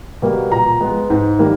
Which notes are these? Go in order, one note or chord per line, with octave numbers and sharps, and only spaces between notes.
B2 G3 A#3
A#2 A#5
G#3 B3
G#2
D#3 G3 A#3